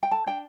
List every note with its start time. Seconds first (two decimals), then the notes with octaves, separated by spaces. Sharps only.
0.03 G5
0.11 A4 A5
0.27 D4 G5